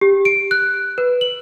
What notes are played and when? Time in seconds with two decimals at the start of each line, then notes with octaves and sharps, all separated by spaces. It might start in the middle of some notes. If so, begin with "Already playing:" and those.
0.01 G4
0.25 D7
0.51 F#6
0.98 B4
1.21 F#7